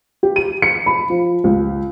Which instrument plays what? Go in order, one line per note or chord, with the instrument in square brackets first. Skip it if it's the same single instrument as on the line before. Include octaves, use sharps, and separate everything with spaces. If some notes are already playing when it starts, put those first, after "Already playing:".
[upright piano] G4
D#7
C#7
B5
F3
C#2